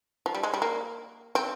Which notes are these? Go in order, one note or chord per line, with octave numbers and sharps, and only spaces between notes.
F3
G3
G#3
G3
A#3
C4